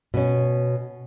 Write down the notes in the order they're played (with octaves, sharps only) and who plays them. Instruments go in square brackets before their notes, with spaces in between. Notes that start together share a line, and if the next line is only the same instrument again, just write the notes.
[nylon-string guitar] B2 C#4